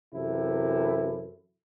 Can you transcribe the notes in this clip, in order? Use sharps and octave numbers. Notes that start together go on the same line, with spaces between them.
F#2 C3 E3 E4 A4